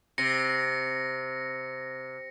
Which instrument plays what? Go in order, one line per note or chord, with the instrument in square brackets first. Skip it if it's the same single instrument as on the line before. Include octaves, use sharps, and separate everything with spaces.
[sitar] C3 [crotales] A#6 C#7